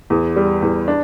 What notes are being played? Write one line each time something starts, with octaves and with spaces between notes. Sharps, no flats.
E2
G3
E2
D4